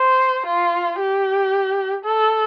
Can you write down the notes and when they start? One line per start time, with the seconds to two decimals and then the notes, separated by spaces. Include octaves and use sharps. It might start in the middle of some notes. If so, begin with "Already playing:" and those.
Already playing: C5
0.46 F4
0.99 G4
2.05 A4